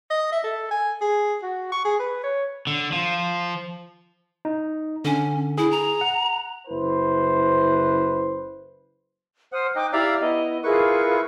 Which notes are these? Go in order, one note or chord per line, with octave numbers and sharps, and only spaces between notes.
D#5
E5
A4
G#5
G#4
F#4
C#6
G#4
B4
C#5
D3
F3
D#4
D3 C#4
E4 G#4
A#5
F#5
F#1 E4 B4 C5
C5 F#5 D#6 F6
D#4 D#5 G5 D6 F#6
E4 G4 D5 E5 F5 A#5
B3 E4 D#5
E4 F4 G#4 A#4 B4 C#6